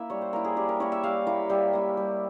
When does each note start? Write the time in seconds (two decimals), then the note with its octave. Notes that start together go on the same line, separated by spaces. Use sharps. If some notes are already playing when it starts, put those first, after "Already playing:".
Already playing: A#3 E4 E5
0.10 G3 C#5
0.22 C5
0.33 A#3 E4 A#4
0.44 G#4
0.57 G3 G4
0.69 A#4
0.80 A#3 E4 C#5
0.92 E5
1.04 G3 F5
1.27 A#3 E4
1.50 G3 E5
1.73 A#3 E4
1.97 G3